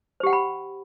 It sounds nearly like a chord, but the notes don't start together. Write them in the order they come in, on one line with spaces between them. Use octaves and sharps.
C5 G4 F#5 G5 B5